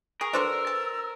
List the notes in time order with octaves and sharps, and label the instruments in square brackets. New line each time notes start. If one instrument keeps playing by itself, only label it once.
[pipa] G#4 [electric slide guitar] A#4 [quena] C#6
[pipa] D4 F#4 A4 [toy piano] B4 C5 C6 [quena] E6
[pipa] A5